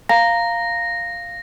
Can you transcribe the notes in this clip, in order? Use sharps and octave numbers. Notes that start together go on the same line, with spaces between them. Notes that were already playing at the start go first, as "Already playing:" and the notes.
F5 A#5 A#6